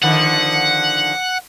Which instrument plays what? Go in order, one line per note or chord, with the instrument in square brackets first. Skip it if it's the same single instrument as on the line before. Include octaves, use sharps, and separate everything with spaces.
[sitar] D3 D#3 F3 [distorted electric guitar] F#5